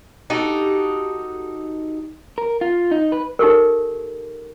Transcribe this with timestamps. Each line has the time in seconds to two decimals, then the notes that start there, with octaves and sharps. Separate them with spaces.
0.30 D#4 F#4 G4 A4
2.38 A#4
2.61 F4
2.91 D#4
3.12 B4
3.39 D#4 G4 A4 A#4